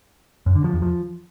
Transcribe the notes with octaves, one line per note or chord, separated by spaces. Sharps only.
F#2
D3
F3
E2
F3